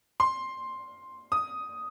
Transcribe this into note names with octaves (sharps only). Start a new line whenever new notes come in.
C6
D#6